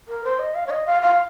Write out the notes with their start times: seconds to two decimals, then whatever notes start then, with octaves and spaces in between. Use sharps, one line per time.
0.08 A#4
0.24 C5
0.39 D#5
0.55 F5
0.67 C#5
0.70 D#5
0.86 F5
1.02 F5